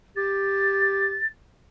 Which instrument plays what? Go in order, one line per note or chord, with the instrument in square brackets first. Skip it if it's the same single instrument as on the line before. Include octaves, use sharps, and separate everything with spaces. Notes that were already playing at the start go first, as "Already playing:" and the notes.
[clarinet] G4 [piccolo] A6